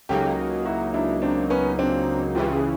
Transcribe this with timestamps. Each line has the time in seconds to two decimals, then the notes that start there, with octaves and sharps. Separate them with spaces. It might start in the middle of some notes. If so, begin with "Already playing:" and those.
0.09 C#2 C#3 F#3 A#3 D#4 G4 A4
0.66 E4 F#4
0.94 D4 E4
1.22 C4 D4
1.50 B3 C#4
1.79 C4 D4
2.35 C#2 C#3 E3 F4 G4
2.53 G#4